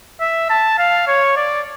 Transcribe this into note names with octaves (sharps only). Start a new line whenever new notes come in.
E5
A5
F5
C#5
D5